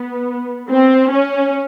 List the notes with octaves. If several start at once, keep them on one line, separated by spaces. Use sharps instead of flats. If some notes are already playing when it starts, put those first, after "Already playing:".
Already playing: B3
C4
C#4